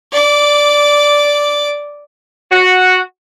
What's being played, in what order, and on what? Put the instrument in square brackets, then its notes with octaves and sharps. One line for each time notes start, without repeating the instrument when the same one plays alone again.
[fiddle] D5 D6
[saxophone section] F#4